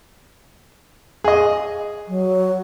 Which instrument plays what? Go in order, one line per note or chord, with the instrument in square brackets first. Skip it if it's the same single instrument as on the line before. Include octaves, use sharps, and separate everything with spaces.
[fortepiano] G#4 D#5
[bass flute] F#3